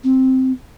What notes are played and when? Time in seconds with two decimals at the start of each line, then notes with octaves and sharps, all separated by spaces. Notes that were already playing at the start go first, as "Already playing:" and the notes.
0.04 C4